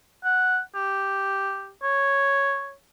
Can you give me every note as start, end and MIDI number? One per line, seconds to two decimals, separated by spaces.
0.24 0.59 78
0.75 1.70 67
1.83 2.73 73